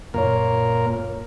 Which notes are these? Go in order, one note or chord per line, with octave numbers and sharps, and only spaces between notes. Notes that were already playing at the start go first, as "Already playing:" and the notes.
F#2 A#2 A#4 C#5